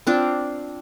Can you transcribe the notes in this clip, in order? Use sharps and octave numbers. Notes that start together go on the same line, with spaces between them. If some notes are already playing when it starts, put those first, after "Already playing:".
C4 D4 F4